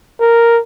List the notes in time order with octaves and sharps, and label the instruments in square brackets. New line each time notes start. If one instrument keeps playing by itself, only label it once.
[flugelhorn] A#4